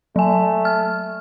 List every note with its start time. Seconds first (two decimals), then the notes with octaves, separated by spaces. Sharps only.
0.16 F#3 A3 G#5
0.65 F6